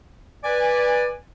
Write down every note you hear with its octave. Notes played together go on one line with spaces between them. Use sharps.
B4 D5 G#5